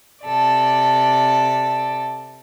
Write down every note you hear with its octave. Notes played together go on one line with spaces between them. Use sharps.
C3 A4 D5